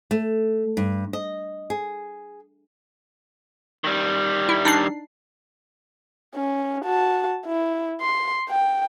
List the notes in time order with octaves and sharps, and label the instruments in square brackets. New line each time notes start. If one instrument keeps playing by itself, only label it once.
[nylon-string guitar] A3
G2
D#5
G#4
[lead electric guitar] D#3 G3
[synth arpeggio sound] E4
D4 D#4 C7
[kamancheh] C#4
F#4 A5
E4
C6
G5